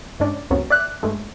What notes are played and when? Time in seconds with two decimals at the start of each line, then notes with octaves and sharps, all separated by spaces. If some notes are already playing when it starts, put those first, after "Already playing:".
0.20 G2 G#3 C#4 D4 D5
0.50 C#2 F#2 C3 F#3 B3 C#4
0.70 D5 E5 F#6
1.03 G2 G#3 A3